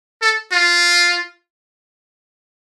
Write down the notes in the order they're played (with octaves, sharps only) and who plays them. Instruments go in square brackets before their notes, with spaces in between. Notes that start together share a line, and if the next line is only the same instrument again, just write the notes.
[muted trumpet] A4
F4